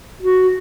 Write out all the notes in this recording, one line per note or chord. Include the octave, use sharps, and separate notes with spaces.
F#4